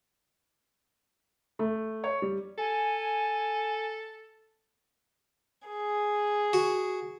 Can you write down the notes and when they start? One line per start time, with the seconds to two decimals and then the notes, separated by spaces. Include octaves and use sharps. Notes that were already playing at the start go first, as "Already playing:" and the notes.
1.59 A3
2.04 C#5
2.22 G3
2.58 A4 G#5
5.68 G#4
6.53 F#4